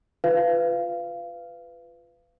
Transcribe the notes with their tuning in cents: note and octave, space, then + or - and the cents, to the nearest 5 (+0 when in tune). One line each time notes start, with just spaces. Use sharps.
F4 +0 B4 +20 F5 -25